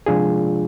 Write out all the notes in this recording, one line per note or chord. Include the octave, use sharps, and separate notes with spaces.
C3 F3 G#3 D4 F4 G#4